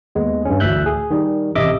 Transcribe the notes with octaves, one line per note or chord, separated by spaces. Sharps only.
D#2 G#3 B3
G2 C#4
A1 D2 A2 E5 F#6 G6
G#4
D#3 G3
A1 C3 D#5 E5 D6